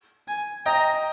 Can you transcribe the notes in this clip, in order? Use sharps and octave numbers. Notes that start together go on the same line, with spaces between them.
G#5
D#5 G5 A#5